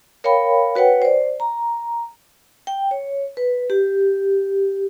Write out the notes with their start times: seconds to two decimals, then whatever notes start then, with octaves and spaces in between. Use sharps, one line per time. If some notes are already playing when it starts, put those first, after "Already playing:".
0.24 A#4 C#5 F5 G5 B5
0.75 F#4 B4 C#5 F#5 G5
1.02 C5 D5
1.40 A#5
2.67 G5
2.91 C#5
3.37 B4
3.70 G4